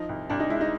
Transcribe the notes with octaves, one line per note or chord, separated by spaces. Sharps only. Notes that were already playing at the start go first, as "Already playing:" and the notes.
Already playing: F3 D#4
C2
C2 D4
D#4
G#3 E4
D#4